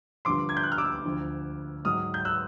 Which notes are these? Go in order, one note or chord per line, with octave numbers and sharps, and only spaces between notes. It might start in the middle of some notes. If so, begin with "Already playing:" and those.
G2 D3 F3 C6 D6
G#6
G6
F#6
F6
D6 E6
D2 D3 F3
G#2 D#3 F#3 D#6 F6
G6
E6 F#6